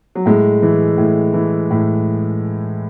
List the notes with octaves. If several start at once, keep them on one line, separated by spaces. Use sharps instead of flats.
F#3
A2 G#3
E3
A2
E3
A2